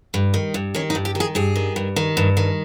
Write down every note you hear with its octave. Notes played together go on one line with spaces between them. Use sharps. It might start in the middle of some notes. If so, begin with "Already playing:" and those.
G2
D#3
G2
D#3 C#4
D#4
G2
G4
D#3
G#4
G2 G#4
D#3
G2
D#3
G2
D#3